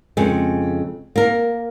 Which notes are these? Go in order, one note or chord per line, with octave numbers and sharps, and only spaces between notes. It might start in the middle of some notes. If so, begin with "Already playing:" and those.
F2 C#3 G#3
A#3 A#4